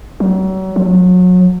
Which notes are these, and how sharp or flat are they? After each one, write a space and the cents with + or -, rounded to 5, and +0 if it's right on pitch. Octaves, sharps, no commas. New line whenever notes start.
F#3 +35
F#3 -30